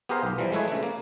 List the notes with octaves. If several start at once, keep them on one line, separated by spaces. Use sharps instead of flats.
B3 G4 G#4 A#4 C5 F5
B1
E3 F3 G3
G#3 A3 E4 B4 C#5
C#3 A3
A#3